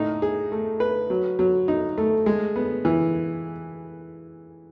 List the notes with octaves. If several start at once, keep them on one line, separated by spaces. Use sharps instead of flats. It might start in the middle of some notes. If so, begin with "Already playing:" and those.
Already playing: A2 D#4
G#4
A3
B4
F#3
F#3
D#4
A3
G#3
B3
E3